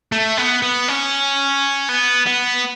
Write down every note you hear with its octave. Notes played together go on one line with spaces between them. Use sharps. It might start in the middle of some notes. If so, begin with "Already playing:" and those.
A3
B3
B3
C#4
B3
B3